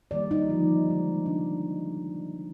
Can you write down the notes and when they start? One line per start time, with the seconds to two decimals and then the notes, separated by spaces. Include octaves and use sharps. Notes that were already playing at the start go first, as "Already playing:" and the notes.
0.11 D#3 G3 A#3 D5
0.31 D#4
0.49 D3 F3 A#3
0.88 D3 G#3 C4
1.26 C3 D4